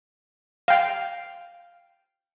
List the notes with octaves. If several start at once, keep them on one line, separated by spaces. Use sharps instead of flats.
F5 G5